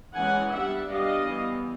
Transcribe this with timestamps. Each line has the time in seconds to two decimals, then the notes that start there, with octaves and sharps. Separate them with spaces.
0.15 E3 G#3 C#4 F#5 G#5
0.52 G3 B3 D4 E5 F#5
0.89 G3 B3 D4 D#5 F5
1.26 E3 G3 B3